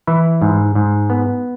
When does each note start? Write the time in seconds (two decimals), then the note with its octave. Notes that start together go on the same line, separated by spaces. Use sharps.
0.07 E3 E4
0.42 G#2
0.75 G#2
1.10 B3